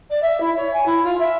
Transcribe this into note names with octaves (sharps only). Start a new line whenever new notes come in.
D5
E5
E4
C#5
G#5
E4
F4
E5